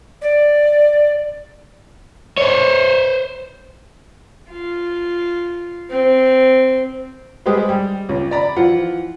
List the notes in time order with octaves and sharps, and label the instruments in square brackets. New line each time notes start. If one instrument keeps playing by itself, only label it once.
[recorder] D5
[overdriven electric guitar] C5 C#5
[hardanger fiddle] F4
C4
[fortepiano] G3 G#3 G4 G#4 B4 C5
G3
C#2
D5 A#5 B5
E3 F3 F4 F#5